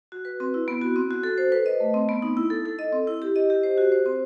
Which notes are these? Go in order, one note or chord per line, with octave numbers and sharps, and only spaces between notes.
F#4
B4
C4
E4
B3
F#4
C4
F#4
A4
C5
B4
D#5
A3
C4
B3
D#4
E4
A4
A4
D#5
C4
E4
G4
D#5
G4
C5
F#4
C5
C4